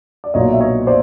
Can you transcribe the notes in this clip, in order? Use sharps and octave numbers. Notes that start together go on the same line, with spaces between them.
D5
B1 A#2 F#3 C#5 D#5
E5
C#5 D#5
C5 D5